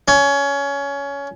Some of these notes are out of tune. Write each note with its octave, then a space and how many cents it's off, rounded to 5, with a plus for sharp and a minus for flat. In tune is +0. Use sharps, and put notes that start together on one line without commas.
C#4 +20